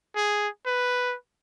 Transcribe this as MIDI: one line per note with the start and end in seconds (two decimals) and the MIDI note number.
0.16 0.48 68
0.66 1.15 71